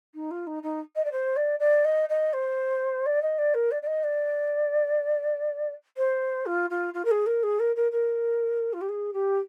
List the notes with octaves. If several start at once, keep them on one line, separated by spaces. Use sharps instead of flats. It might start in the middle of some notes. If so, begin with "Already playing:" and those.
D#4
F4
D#4
D#4
D#5
D5
C5
D5
D5
D#5
D#5
C5
D5
D#5
D5
A#4
D5
D5
D#5
D5
C5
F4
F4
F4
A#4
G#4
A#4
G#4
A#4
A#4
A#4
F4
G4
G#4
G4